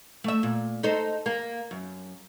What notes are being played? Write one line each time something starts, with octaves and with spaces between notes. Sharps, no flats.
A3 E5
A#2
D#4 A4 C5
A#3
F#2